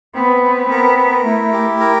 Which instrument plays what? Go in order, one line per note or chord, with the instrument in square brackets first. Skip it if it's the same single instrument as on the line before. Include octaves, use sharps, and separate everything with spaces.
[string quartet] B3 [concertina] C4
[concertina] C4
[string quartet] B3 [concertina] A#4
[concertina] A#4
[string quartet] A3 [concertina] E4
[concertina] G4
A#4